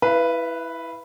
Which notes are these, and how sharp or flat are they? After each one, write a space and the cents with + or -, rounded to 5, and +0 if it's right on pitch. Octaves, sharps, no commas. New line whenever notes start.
E4 +0 B4 +0 F5 -45